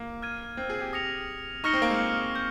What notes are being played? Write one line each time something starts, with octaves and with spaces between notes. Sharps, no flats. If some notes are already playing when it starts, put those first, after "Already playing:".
Already playing: A#3
F6 G#6 D#7
C4
G#4
G4
D#6 A#6 C#7 F7
D#4 C#6 F6 A#6 C#7 G7
C4
A#3
G#3
G6